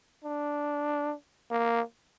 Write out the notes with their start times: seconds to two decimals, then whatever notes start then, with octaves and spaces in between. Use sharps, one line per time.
0.24 D4
1.51 A#3